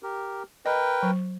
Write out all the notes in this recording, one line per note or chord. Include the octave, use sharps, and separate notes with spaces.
G4 A#4
A#4 B4 D#5 G5
F#3